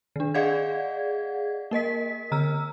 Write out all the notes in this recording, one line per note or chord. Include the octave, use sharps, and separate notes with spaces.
D#3 D4
G#4 D5 D#5 F5 F#5 G#6
A#3 A#4 D#5 B6
D3 A#5 E6 F6